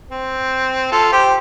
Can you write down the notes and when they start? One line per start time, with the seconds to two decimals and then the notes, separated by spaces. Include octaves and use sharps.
0.11 C4
0.92 F4 A4
1.12 G4 C5